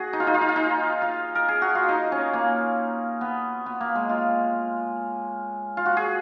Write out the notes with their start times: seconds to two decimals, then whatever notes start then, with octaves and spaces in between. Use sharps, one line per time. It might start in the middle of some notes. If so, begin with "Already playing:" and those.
Already playing: F#4 G#4
0.13 D#4
0.20 F4
0.27 D#4
0.34 F4
0.41 D#4
0.49 F4
0.56 D#4
1.02 F4
1.35 A#4
1.48 G#4
1.62 F#4
1.75 F4
1.89 D#4
2.12 C#4
2.33 A#3
3.21 B3
3.66 B3
3.80 A#3
3.95 G#3
4.09 F4
5.77 F4
5.86 F#4
5.97 G#4